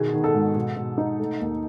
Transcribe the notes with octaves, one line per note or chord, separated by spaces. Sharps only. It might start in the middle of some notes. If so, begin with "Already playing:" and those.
Already playing: B2 D#3 G#4
D#3
A4
G#2
B2
B2
D#4
A3
D#2